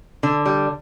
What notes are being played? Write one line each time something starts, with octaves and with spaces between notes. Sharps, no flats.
D3
G3